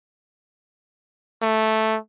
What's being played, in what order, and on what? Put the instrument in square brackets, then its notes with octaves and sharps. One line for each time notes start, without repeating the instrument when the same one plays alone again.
[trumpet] A3